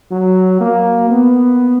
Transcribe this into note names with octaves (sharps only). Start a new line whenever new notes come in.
F#3
A#3
B3